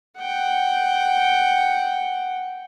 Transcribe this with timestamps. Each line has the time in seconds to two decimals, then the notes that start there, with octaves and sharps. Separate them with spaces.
0.18 F#5 G5